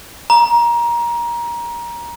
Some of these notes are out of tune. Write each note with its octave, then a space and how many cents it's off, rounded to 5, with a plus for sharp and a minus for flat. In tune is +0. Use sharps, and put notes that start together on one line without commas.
A#5 +20